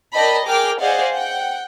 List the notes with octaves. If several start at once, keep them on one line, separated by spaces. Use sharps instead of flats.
A#4 D5 D#5 G5 A5 B5
G#4 A#4 G5 D6 F6
G#4 C5 D5 D#5 F5 F#5
F#5 G5